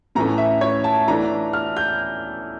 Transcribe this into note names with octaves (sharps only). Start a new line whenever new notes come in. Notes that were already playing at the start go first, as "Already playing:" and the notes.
A2 E3 A3 C#4 A#5
E5
C#5
A5
E3 A3 D4 A#5
F6
G6